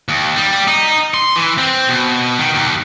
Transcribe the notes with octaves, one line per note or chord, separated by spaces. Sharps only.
D#2
G3
D#4
C6
E3
C4
B2
D#3
D#2